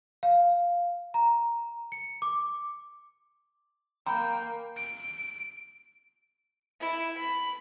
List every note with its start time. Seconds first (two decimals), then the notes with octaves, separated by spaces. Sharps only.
0.23 F5
1.14 A#5
1.92 C#7
2.22 D6
4.07 A#3 G5 A#5 B5
4.76 D7
6.80 E4
7.18 B5